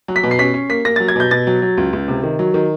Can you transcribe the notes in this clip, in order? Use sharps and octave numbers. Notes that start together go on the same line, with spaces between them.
F#3
B6
B2
C7
C#4 B6
C#4
A#3 B6
A#3 A#6
F#3 A6
G#6
B2 G6
B2 A6
F#3
F#3
C#2
C#2
C3
D#3
F#3
D#3